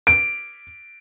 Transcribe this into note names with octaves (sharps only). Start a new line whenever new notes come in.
D7